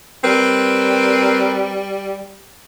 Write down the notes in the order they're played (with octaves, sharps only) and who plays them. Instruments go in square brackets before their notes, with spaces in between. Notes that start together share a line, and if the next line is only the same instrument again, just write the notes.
[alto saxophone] G3 [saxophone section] C4 A#4 B4